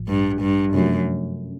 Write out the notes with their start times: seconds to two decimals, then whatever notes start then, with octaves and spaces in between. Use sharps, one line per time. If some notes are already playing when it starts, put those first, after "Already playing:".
Already playing: A1 A2 F3
0.08 G2
0.41 G2
0.74 F#2 C3 F3 A3 C#4